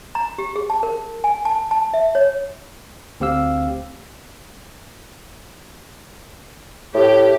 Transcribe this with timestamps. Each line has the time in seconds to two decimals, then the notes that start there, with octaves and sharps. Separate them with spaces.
0.15 A#5
0.38 G4
0.56 G#4
0.70 A5
0.83 A#4
1.24 G#5
1.45 A5
1.71 A5
1.94 E5
2.15 C#5
3.20 D2 C4 G4 F5 E6
6.94 A2 G4